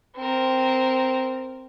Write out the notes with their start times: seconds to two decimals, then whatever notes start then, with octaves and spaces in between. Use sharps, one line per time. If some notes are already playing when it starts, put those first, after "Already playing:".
0.16 C4 A#4